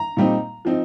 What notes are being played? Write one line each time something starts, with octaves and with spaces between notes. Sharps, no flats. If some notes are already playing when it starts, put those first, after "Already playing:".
Already playing: A#5
A#2 G3 C4 D#4
F3 C4 D#4